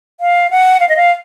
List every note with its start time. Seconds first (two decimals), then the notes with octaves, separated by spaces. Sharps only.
0.20 F5
0.51 F#5
0.80 F5
0.89 D#5
0.96 F5